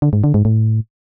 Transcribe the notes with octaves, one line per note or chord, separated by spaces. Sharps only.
D3
G#2
D3
G#2
A2